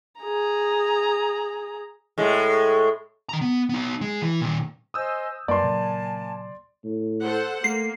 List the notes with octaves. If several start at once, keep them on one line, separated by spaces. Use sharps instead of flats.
G#4 A#5
A2 G#3
D#3 A#5
B3
B3 D#4
G#3
E3
A#2 D#3
C5 D#5 G#5 D#6 E6 G6
F#2 F#3 G3 A#3 D5 G#5 A5 C6
A#2 C#3 F#3
A2
A4 C5 F#5
A3 A#3 C7